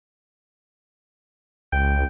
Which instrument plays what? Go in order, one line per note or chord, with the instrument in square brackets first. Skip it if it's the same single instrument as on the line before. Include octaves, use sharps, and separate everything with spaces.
[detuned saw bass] C#2 [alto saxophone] G5